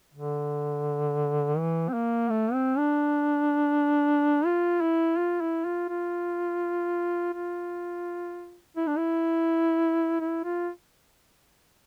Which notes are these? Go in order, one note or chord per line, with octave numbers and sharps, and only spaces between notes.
D3
E3
C4
A#3
A3
C4
D4
F4
E4
F4
E4
F4
F4
F4
E4
D4
E4
E4
F4